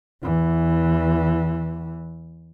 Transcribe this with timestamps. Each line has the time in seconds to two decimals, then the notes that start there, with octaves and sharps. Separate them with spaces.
0.22 E2 E3